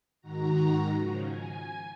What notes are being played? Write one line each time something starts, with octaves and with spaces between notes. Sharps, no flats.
G#2 D#3 F#4 A#5
C#3 F3
G#5